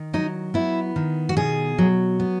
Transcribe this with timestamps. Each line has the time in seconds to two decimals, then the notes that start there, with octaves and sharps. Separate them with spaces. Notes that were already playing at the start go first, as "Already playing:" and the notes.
Already playing: D#3
0.13 F#3 D#4
0.54 B3 E4
0.96 D#3
1.29 F#4
1.37 B2 G#4
1.78 F#3
2.20 B3